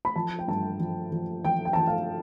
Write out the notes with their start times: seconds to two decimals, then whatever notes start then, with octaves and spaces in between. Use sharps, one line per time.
0.05 B5
0.16 F3 A5
0.39 G5
0.48 G2 A5
0.80 F3
1.12 F3
1.44 F3 G5
1.65 G5
1.73 A5
1.77 F3 G5
1.87 F5